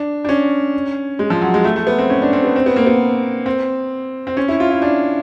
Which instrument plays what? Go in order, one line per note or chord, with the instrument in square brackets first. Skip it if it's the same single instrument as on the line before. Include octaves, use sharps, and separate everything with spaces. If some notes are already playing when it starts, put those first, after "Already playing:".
Already playing: [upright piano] D4
D4
C#4
G#3
F3
F#3
G#3
A3
A3
B3
C4
C#4
D4
C4
B3
C4
B3
A#3
B3
C4
C4
C#4
E4
F4
E4
D4